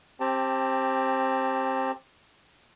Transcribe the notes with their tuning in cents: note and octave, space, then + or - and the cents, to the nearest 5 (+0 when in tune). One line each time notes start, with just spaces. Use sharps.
C4 +20 G4 +0 A5 +15